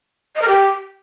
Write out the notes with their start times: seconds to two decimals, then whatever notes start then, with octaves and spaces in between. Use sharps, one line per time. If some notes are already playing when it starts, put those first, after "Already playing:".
0.35 D#5
0.42 A#4
0.48 G4